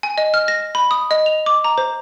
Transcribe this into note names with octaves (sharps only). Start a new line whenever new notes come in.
G#5
D#5
F6
A#6
B5
D#6
D#5
F7
D6
A#5
C5